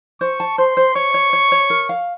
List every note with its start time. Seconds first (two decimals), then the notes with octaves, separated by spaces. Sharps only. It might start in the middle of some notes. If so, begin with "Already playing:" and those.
0.21 C5 C#6
0.40 A5
0.58 C5 C6
0.77 C5
0.95 C#5 C#6
1.14 C#5
1.33 C#5
1.52 C#5
1.70 A#4
1.89 F5